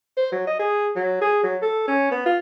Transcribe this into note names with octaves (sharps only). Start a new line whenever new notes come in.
C5
F#3
D#5
G#4
F#3
G#4
F#3
A4
C#4
B3
F4